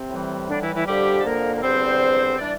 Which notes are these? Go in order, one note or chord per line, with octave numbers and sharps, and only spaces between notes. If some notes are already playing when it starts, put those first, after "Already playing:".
Already playing: C3 C4
A2 E3 G3
D3 D4
E3 E4
E3 E4
F2 D3 F3 G3 G4
A4
A#3 A#4
A#4
E2 D3 G3 C4 C5
E3 G3 D4 D5